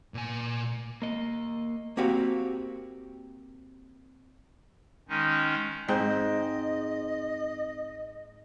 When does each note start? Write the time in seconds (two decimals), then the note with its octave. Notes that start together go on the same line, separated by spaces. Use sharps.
0.14 A#2 G#5
1.02 A#3 D#5
1.97 A#3 C4 F#4 G4 F5
5.09 D#3 G#3 C#4 D#4
5.88 G#2 C4 D#5